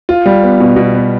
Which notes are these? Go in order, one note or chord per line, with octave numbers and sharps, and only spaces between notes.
F4
G3
B3
B2
B2
B3